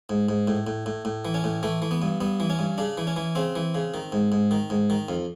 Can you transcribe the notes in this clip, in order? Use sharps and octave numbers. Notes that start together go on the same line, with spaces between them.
G#2
G#2
A2
A2
A2
A2
E3
C#4
A2
E3 A3
E3
B3
G2
G2 B3
E3
C#4
G2
C#3 D4
E3
C#4
E3
C#3 C4
E3
C#3
D#3
G#2
G#2
D#3
G#2
D#3
F2